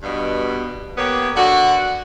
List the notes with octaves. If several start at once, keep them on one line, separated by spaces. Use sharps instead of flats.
G2 B2
A#3 B3 G4 C#5
D3 F#4